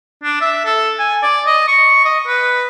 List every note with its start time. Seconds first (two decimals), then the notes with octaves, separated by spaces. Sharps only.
0.24 D4
0.41 E5
0.65 A4
0.99 G#5
1.23 D5
1.46 D#5
1.68 C#6
2.05 D#5
2.27 B4